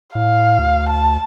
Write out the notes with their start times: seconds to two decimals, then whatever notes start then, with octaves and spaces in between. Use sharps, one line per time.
0.15 A2 F5
0.59 D2
0.89 A5